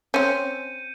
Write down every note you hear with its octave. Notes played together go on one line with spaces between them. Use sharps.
C4 C#4 G6 C#7 D#7